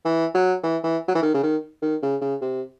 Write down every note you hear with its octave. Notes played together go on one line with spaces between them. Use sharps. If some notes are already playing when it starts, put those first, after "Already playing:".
E3
F#3
E3
E3
F#3
E3
D#3
C#3
D#3
D#3
C#3
C#3
C3